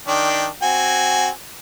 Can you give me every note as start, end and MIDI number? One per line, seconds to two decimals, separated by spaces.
0.08 0.47 51
0.08 0.47 62
0.08 0.47 79
0.62 1.29 60
0.62 1.29 66
0.62 1.29 80